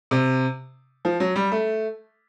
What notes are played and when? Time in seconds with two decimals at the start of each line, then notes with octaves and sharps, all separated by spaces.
0.11 C3
1.05 F3
1.20 F#3
1.36 G3
1.52 A3